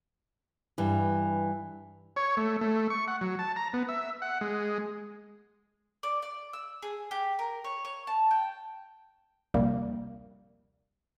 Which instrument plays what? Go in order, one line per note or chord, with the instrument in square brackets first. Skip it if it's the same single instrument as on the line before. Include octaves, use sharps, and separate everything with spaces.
[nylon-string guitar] G2 E3
[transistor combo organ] C#5
A3
A3
C#6
F#5
F#3
A5
A#5
B3
E5
F#5
G#3
[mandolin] D5
D5
E6
G#4
G4
A#4
C#5
C#5
A5
G5
[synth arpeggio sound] A#1 D#2 C3 G3 A#3